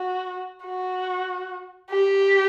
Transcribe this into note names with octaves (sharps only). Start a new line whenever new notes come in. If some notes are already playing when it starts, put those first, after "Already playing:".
Already playing: F#4
F#4
G4